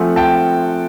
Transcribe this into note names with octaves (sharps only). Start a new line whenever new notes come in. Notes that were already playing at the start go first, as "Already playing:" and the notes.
Already playing: F3 A3 C4 F#5 G#5
G5 A5